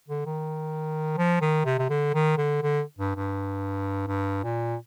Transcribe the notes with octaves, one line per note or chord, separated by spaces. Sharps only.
D3
D#3
F3
D#3
C3
C3
D3
D#3
D3
D3
G2
G2
G2
A#2